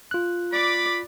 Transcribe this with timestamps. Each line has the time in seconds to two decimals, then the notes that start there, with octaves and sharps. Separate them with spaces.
0.11 F4 F#6
0.53 D5 B5 D6